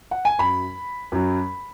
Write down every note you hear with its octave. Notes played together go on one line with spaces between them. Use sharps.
F#5
G#5
F#2 F#3 B5
F#2 F#3